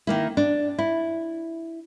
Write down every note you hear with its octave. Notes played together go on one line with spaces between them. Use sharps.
D#3 A#3 E4
D4
E4